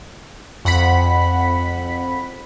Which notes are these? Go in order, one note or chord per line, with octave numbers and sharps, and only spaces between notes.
F2 F#5 B5 B6